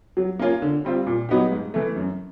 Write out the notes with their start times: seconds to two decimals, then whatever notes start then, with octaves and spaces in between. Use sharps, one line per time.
0.17 F#3
0.39 A#3 C#4 F4
0.62 D3
0.85 G3 C4 F4
1.07 A#2
1.29 F#3 B3 D#4 G4
1.52 G#2
1.74 E3 A3
1.96 F#2